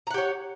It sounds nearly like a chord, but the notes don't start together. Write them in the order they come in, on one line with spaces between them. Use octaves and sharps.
A#5 F#5 G4 C#5